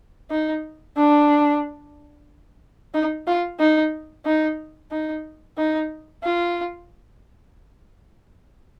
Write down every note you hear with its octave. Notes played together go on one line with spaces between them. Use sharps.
D#4
D4
D#4
F4
D#4
D#4
D#4
D#4
F4